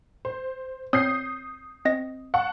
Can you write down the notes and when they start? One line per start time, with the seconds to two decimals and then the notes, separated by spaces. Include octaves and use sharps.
0.25 C5
0.93 C4 C#5 D#6 G6 C7
1.85 C4 D#5 A#6
2.34 F#5 A5 C#6